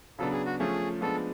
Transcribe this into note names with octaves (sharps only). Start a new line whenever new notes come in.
C#3 F#3 B3 D4 A4
G#4
F#4
F3 A3 C#4 G#4
F3 G#3 B3 D4 A4